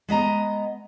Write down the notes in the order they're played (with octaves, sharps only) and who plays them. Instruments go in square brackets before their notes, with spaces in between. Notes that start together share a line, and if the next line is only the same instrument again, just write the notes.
[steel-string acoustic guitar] G#3 B3 D#5 A#5